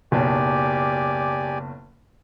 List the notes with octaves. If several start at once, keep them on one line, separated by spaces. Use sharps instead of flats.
F#1 B1 G4 D5 G#5